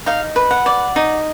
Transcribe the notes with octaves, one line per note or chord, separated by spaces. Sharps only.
D#4 F5
B4
F#5
D5
D#4